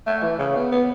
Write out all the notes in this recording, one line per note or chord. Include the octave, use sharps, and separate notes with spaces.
A3
E3
C#3
B3
B3